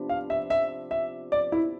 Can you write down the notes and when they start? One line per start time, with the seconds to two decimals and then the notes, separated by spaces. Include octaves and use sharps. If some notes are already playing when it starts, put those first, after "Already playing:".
Already playing: C3 F3 B3 D4
0.09 F5
0.30 E5
0.50 E5
0.91 E5
1.32 D5
1.52 E4